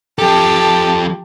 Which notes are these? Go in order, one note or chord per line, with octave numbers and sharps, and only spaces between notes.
F3 G4 A4 A5